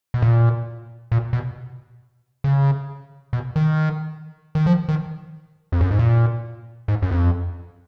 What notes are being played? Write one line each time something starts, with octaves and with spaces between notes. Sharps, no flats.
B2
A#2
A#2
B2
C#3
B2
D#3
D#3
F3
D#3
F2
F#2
G#2
A#2
G#2
F#2
F2